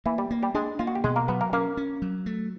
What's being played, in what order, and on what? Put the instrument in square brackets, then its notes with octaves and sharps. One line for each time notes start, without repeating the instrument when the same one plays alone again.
[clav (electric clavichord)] E3 E4 [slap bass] A#3
[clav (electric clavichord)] G3 G4
[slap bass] A#3
[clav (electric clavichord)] G3 G4
[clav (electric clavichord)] G#3 G#4 [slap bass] D4
[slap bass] A#3 [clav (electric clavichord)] F4
[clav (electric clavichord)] F#4
G4
[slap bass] B2 [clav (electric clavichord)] G#3 G#4
[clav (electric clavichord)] A#3 A#4
[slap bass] F#3 [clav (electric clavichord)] B3 B4
[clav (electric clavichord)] A#3 A#4
[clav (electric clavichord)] A#3 A#4 [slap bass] C#4
[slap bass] C#4
F#3
A3